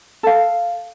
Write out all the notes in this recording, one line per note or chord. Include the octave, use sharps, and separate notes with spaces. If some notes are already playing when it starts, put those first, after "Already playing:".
A4 F5